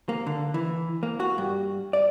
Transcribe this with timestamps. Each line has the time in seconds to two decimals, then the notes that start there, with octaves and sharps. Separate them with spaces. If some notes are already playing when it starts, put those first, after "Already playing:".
0.09 A#3
0.27 D3
0.54 E3
1.03 A#3
1.20 F#4
1.38 G2
1.93 D5